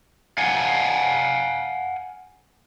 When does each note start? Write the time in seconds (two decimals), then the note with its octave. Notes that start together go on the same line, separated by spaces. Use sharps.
0.38 F5 F#5 G#5